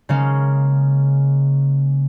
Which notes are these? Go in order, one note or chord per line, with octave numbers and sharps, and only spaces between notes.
C#3 G#3 A#3 C#4